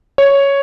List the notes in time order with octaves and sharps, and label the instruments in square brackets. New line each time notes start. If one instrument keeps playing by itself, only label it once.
[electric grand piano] C#5